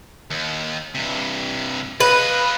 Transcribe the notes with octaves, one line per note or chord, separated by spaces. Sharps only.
D#2
G2 C3
F4 B4 D#5